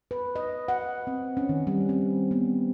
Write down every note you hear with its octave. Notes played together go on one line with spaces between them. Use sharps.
B4
D#5
F#5
C4
C#4
D#3
G3
C4
B3